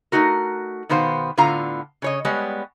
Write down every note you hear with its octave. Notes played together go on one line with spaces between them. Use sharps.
A3 C#4 D#4 F#4 A#4
B2 D#3 B3 C5 F5
A2 D3 B3 F4 F5 A#5
C#3 C#5 D#5
G3 G#3 B3 C#5